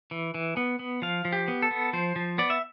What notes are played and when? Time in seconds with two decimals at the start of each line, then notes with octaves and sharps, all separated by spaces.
0.11 E3
0.34 E3
0.57 B3
0.79 B3
1.02 F3 F5
1.25 F3
1.33 G4
1.48 B3
1.62 A4
1.71 B3
1.93 F3 C5
2.16 F3
2.38 B3 D5
2.50 E5